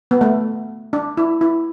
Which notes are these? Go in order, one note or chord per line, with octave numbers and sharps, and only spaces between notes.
B3
A3
D4
E4
E4